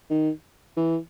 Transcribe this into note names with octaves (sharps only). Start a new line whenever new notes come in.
D#3
E3